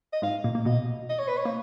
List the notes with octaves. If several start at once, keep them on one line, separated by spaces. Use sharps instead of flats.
D#5
G#2 G#3 F5
A#2 A#3
A#3
B2 B3 D#5
D#5
C#5
B4
C#5
A#3